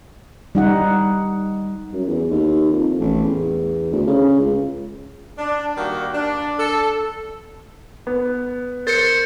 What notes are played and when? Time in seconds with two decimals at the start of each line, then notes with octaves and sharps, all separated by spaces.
0.55 G3 D#4 F#5
1.93 F#2
2.07 E2
2.31 D#2
2.72 F2
3.00 A1
3.24 E2
3.92 D2
4.07 C#3
4.39 C#2
5.37 D4
5.77 D#3 G3 A#3 F#4
6.14 D4
6.59 A4
8.07 B3
8.87 A#4 C5 A6 C#7